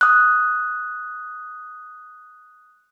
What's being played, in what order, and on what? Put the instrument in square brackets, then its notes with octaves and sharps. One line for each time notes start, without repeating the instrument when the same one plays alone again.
[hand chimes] D#6 F#6